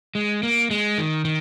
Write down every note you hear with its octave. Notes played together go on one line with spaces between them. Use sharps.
G#3
A#3
G#3
D#3
D#3